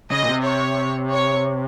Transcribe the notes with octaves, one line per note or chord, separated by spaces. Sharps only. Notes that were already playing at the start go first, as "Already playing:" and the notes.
C#3 D#5
A#2
C3
C#5
C#5